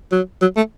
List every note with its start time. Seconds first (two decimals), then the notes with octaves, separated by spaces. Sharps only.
0.12 F#3
0.42 F#3
0.57 A3